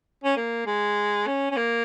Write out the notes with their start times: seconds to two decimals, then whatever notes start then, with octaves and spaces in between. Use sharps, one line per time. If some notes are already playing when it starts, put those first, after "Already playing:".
0.24 C#4
0.37 A#3
0.66 G#3
1.27 C#4
1.51 C#4
1.56 A#3